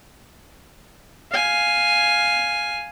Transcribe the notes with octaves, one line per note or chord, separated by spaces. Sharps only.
F5 G#5